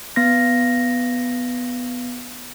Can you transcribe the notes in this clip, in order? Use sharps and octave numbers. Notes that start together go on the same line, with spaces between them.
B3 A#6